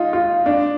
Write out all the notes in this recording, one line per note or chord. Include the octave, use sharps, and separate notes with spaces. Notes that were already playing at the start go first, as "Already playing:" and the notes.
Already playing: D#4 F4
F4
D4